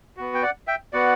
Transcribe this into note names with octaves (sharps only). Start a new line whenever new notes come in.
B3 F#4
G5
D5 F#5
E5 G5
B3 F#4 D5 F#5